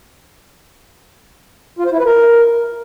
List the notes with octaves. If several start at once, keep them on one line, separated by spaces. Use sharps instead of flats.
F4
C5
E4
B4
A#4